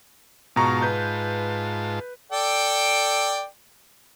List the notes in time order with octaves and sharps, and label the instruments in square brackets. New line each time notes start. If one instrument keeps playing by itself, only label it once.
[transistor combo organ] G#2 F4 A5 [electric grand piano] B2 A#5 C#6
[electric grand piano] B4 G6
[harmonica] A4 D5 G5